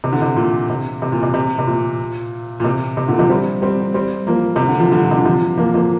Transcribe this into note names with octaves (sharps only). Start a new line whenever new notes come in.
C3
D3
C3
A#2
C3
C3
A#2
C3
C3
C3
A#2
A#2
C3
C3
A#2 D3
C3 F3
G3 C4
G3 C4
G3 C4
F3 A#3
C3
D3
F3
D3 G3
A#2
C3
D3
C3 F3
F3 A#3
F3 A#3